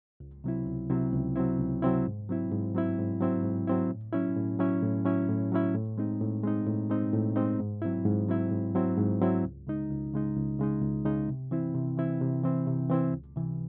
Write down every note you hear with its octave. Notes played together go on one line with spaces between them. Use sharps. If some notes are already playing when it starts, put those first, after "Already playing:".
C#2
C3 F#3 C4 E4
C#2
C3 F#3 C4 E4
C#2
C3 F#3 C4 E4
C#2
C3 F#3 C4 E4
G#2
F#3 C4 E4
G#2
F#3 C4 E4
G#2
F#3 C4 E4
G#2
F#3 C4 E4
A2
F#3 C#4 E4
A2
F#3 C#4 E4
A2
F#3 C#4 E4
A2
F#3 C#4 E4
A2
G#3 C4 D#4
A2
G#3 C4 D#4
A2
G#3 C4 D#4
A2
G#3 C4 D#4
G#2
F#3 C4 E4
G#2
F#3 C4 E4
G#2
F#3 C4 E4
G#2
F#3 C4 E4
C#2
C#3 G#3 D#4
C#2
C#3 G#3 D#4
C#2
C#3 G#3 D#4
C#2
C#3 G#3 D#4
C3
E3 C4 E4
C3
E3 C4 E4
C3
E3 C4 E4
C3
E3 C4 E4
C#2
C3 E3